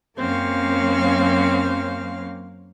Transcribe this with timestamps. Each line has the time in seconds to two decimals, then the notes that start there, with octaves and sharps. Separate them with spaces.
0.16 F#2 F#3 A#3 C4 C#4 F5